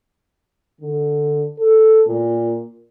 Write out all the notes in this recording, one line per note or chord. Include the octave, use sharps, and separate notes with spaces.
D3
A4
A#2